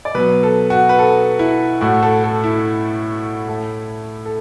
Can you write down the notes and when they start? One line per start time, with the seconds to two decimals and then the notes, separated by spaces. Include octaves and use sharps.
0.05 D5
0.14 B2 F#3 B3 B4
0.43 A4
0.70 F#4
0.89 B4
0.99 A4
1.39 E4
1.81 A2 A3 F#4
2.03 A4
2.24 A4
2.44 E4
3.48 A2 A3
4.26 A4